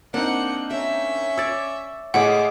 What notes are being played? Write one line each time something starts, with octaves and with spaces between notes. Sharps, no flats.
A#3 C4 D4 D#4 F#5
C#4 A#4 E5
C#5 D5 E6 A6
A2 G#3 G#4 C#5 F#5 B5 D6